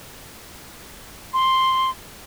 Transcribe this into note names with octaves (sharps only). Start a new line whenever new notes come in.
C6